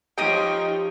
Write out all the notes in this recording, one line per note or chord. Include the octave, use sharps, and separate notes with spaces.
F3 D#4 G4 C#5 G5 A#5 D#6